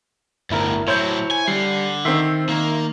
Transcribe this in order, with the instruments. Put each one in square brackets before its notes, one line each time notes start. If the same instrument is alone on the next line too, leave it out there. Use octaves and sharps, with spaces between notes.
[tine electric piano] G1 E4 A#4 [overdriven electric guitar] D2 A2
[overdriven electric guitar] A2 F#3 [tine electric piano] E4 C5 [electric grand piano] C#5 G6
[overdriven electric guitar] G#5
[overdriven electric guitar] D3 [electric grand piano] G3 [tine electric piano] C7
[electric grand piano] D#3 C4 [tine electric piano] E5 C6
[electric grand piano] D#3 [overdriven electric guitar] A#3